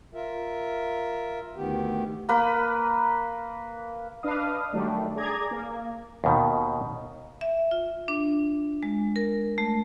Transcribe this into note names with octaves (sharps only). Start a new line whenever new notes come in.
F4 A#4 E5
D2 D#3 B3 G4
A#3 B4
D4 B4 D#5 F5 D#6
D#3 F#3 G3 A3 D4
G#4 D5 A#5 G#6
A#3
D#2 B2 D#3
E5
F4
D4
G#3
A#4
A3